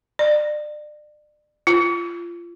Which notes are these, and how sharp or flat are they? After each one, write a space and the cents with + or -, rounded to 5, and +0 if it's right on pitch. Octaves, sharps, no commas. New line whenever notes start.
D5 +35
F4 -20